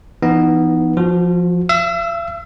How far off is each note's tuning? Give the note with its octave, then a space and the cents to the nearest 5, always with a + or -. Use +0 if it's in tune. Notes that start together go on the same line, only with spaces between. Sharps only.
E3 +30 B3 +0 D#4 +0
F3 +0 F#4 -35
E5 +45 E6 -5